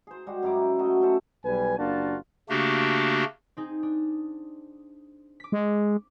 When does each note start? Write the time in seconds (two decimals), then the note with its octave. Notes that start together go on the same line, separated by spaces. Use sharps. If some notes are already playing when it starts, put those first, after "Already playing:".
0.07 G#4 C5
0.27 G3 G#3 F#4
0.43 F#2 E4 A#5 D6
0.79 F#3 A3 F#4 D#5
1.01 C#4 E4 A4 C5
1.45 B1 G3 B4 G#5
1.78 F#1 A#3 D4 F4 F#4 A5
2.49 C#3 A3 A#3 D4 F#4 G4
3.57 C4 D#4 G#4
3.83 D4
5.40 D6 B6
5.52 G#3